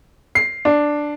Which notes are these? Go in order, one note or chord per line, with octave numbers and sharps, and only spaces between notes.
C7
D4